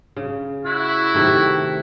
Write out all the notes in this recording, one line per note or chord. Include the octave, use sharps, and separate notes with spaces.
C#3
E4 F#4
C3 D#3 A3